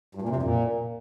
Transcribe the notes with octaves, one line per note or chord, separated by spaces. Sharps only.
G2
A#2
C3
F2
A#2